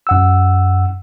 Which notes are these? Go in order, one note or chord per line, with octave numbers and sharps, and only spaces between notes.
F#2 F#5 E6